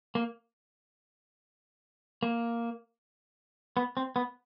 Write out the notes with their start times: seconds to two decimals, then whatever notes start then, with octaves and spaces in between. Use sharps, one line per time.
0.15 A#3
2.23 A#3
3.77 B3
3.97 C4
4.16 B3